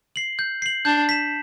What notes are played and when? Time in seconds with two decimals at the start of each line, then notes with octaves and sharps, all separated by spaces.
0.16 C7 F#7
0.39 G6
0.62 C7 F#7
0.85 D4 G6
1.09 B6 E7